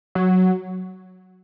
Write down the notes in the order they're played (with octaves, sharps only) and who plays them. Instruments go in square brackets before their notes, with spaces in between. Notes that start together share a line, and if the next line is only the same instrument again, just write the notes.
[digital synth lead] F#3